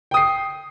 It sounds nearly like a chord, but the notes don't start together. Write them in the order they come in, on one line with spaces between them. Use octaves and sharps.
G5 D#6 C7